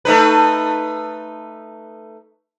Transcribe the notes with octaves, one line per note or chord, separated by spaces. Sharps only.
A3 D#4 B4